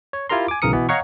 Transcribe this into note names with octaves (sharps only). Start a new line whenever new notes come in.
C#5
E4 F4 G4 A#4 A#5 C6
G#5 D6
B1 C#3 E3 A#4 D#6 C#7
B2 E3 B3
C#5 D#5 F5 F#5 A#5 C#6